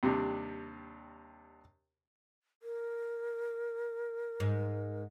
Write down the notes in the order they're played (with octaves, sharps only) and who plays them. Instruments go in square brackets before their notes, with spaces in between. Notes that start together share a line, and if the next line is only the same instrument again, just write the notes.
[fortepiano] D#2 C3 G3 D4
[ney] A#4
[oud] G#2